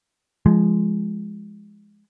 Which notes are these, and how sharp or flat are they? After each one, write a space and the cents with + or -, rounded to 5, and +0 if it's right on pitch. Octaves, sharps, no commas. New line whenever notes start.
F3 -20 G#3 +0